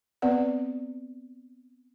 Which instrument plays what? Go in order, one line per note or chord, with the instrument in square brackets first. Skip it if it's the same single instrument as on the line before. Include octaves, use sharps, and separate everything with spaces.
[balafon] B3 C4 B4 D5 F#5